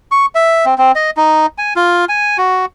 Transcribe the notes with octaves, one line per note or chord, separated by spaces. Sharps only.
C#6
E5
C4
C4
D#5
D#4
G#5
F4
G#5
F#4